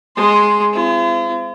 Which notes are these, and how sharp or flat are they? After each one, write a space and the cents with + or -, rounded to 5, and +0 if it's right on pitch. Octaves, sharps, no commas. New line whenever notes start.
G#3 +0 C6 +0
C4 -25 F4 -45